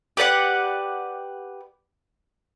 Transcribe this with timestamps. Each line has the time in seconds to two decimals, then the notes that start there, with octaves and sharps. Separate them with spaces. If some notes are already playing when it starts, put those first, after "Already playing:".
0.17 G4 B4 D5 F#5